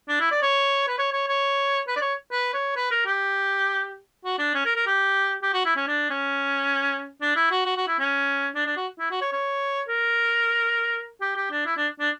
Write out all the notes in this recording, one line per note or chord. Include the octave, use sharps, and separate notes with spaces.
D4
E4
D5
C#5
B4
C#5
C#5
C#5
B4
D5
C#5
B4
C#5
B4
A#4
G4
F#4
D4
C#4
A#4
A#4
G4
G4
F#4
E4
C#4
D4
C#4
D4
E4
F#4
F#4
F#4
E4
C#4
D4
D4
F#4
E4
F#4
C#5
C#5
A#4
G4
G4
D4
E4
D4
D4